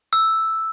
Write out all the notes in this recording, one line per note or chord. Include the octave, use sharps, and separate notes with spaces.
E6